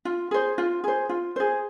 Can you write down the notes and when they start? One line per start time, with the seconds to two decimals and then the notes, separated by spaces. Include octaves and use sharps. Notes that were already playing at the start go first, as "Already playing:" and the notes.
0.05 F4
0.31 G#4 C5
0.58 F4
0.84 G#4 C5
1.09 F4
1.36 G#4 C5